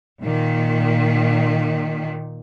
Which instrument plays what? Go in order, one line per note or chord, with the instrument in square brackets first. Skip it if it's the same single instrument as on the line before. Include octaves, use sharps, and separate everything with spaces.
[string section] A#2 D#3